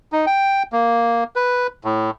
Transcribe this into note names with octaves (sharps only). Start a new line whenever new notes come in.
D#4
G5
A#3
B4
A2